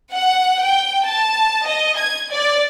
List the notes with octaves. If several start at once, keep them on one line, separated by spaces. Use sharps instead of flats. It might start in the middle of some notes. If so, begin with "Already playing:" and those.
F#5
G5
A5
D#5
G#6
D5